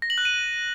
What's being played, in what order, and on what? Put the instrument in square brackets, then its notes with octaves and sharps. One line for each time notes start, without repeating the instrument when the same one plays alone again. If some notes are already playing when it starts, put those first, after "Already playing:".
[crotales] A#6
F#7
F#6
D#7